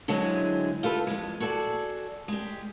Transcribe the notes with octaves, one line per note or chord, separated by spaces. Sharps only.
D3 F#3 G#3 C4 E4 G#4
F4 G4 A4 B4
F2 G#3
F#4 G#4 A4 C#5 D5
G#3 G4